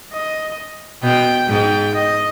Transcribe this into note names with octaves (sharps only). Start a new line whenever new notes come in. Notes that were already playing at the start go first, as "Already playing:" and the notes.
D#5
B2 G5
G#2 G5
D#5